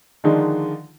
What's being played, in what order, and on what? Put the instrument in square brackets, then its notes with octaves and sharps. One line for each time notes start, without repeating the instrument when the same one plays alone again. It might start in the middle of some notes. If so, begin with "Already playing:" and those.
[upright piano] D3 D#3 F3 G#3 D4 D#4